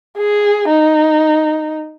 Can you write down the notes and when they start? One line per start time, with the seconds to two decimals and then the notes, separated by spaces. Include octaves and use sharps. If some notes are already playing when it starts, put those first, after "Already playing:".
0.17 G#4
0.68 D#4